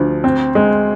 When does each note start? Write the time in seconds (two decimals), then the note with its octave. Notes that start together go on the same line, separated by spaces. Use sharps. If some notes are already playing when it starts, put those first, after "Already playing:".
Already playing: D2 F3
0.24 C4
0.55 G#3